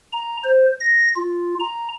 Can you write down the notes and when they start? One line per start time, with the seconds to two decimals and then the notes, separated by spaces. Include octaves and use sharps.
0.13 A#5
0.44 C5
0.80 A#6
1.16 F4
1.60 A#5